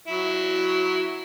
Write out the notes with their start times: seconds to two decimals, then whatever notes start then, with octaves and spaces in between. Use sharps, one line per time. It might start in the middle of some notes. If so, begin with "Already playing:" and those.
0.07 F#3 E4